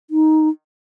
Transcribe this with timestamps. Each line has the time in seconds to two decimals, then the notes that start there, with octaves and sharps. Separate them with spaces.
0.10 D#4